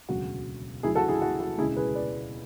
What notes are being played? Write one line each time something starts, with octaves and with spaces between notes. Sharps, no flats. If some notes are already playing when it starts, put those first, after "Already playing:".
E1 D2 C#3 F#3 F#4
D2 C#3 F#3 E4 G#4
F#4 A4
E4 G#4
F#4
F#4
E1 D2 C#3 G#3 C#4 E4 G#4
G#4 B4
B4 D5